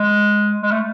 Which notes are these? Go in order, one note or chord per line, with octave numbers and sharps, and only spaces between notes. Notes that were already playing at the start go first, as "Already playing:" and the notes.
Already playing: G#3
G#3
A3